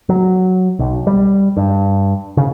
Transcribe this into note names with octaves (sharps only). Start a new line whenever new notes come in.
F#3
B1
G3
G2
C#3